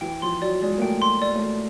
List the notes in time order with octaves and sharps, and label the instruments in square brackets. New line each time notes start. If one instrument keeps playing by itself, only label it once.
[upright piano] E3 [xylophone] G5
[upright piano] F3 [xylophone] C6
[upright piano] F#3 [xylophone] D5
[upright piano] G#3 [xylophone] D5
[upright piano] A#3
[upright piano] A3 [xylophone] G5
[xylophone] C6
D5
[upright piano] A3
[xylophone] D5